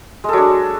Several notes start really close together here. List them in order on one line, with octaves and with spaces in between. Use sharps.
G#3 A4 F#3 D4